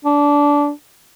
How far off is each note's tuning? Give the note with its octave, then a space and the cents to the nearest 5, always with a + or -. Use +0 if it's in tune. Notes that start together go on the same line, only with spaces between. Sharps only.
D4 -20